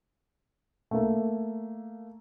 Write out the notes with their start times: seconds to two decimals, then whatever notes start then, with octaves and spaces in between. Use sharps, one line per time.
0.91 A3 A#3